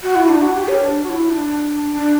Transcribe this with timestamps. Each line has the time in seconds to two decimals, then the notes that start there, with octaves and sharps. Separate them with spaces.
0.03 F#4
0.15 E4
0.28 D4
0.42 F#4
0.55 G4
0.68 C#5
0.83 D4
1.03 F#4
1.09 E4
1.31 D4
1.92 D4